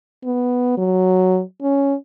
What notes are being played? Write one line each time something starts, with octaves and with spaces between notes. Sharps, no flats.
B3
F#3
C#4